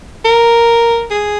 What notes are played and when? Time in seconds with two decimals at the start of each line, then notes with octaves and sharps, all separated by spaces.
0.25 A#4
1.11 G#4